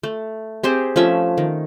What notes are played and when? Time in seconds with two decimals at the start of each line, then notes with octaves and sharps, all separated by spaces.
0.03 A3
0.64 C4 G4 G#4 C5
0.96 F3 A3 C#4 E5
1.38 D#3